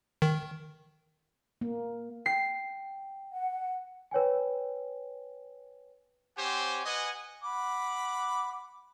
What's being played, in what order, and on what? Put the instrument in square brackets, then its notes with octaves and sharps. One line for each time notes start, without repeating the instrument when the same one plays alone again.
[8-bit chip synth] D#3
[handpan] A#3
[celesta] G5 [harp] C7
[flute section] F#5
[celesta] B4 C#5 G5 G#5
[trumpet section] C4 G4 C5 C#5 F#5 G#5
B4 D#5 F#5 G#5
[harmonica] F#5 B5 D6